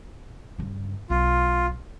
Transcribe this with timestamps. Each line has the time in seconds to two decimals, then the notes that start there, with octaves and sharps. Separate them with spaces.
0.59 G2 C#3
1.10 B1 F4